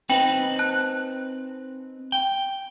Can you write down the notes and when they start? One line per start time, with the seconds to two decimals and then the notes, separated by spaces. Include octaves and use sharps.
0.10 C4 D#4 B4 G5
0.59 A5 F#6
2.12 G5